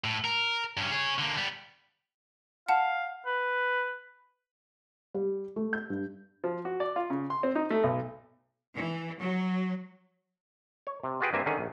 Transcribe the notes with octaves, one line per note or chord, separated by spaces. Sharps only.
A2
A#4
G2 C#4
G#4 C#5
D3 A#3
G3 B3
F5 F#5 A5
B4
G3
A3
G6
G2
F3
F#4
D5
F4
C#3
C6
C4
D#4
A3
B1
E3
F#3
C#5
C3
F4 F#4 G#4 B4 G5
G2 A#3 C4 E5 G#5
D3 D#3 C#4 G#4
A#1